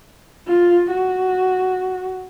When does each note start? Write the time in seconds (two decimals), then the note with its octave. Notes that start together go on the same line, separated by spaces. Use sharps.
0.47 F4
0.90 F#4